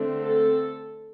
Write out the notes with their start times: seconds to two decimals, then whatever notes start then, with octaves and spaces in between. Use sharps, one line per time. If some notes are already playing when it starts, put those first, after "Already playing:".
Already playing: D3 A3 C4
0.24 A4